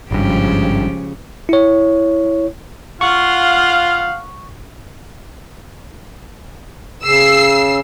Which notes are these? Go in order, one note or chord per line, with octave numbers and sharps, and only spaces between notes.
G#1 G2 C#3 F3 G#3 G4
E4 C#5
F4 F5 F#5 C#6
C#3 E6 C7